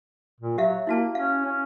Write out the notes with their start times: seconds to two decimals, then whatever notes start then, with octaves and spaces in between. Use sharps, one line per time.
0.40 A#2
0.58 F#3 G4 E5 F5
0.87 A#3 E4 F#4 A5
1.15 C#4 F5
1.46 C#4